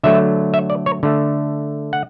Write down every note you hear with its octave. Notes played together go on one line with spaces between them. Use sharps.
D3 F#3 A3 E5
E5
D5
C#5
D3 A3
F#5